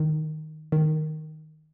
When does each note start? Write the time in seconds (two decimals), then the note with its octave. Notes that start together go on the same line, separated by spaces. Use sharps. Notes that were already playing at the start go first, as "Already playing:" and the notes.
Already playing: D#3
0.72 D#3